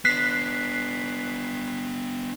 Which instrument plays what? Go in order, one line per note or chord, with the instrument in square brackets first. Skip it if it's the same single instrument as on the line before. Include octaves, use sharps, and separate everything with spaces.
[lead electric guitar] B3 D4 [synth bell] F#6 B6 C7